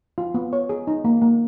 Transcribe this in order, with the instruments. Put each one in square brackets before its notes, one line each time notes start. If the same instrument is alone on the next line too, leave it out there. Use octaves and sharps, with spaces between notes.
[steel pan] F4
B3
C#5
G#4
D#4
A#3
A#3